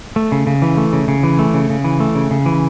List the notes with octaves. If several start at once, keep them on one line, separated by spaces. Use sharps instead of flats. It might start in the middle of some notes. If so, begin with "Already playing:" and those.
A3
C#3
C#3
E3
A3
C#3
C#3
E3
A3
C#3
C#3
E3
A3
C#3
C#3
E3